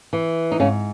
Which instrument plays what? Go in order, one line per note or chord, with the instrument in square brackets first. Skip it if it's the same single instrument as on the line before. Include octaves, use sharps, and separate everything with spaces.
[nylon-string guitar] E3
D#4
G#2 C#3 C#4